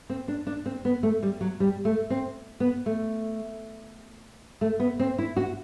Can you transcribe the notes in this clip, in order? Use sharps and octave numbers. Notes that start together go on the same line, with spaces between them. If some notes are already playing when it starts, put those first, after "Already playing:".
C4
D4
D4
C4
B3
A3
G3
F#3
G3
A3
C4
B3
A3
A3
B3
C4
E4
F#4